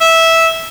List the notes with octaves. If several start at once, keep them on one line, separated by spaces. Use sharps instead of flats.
E5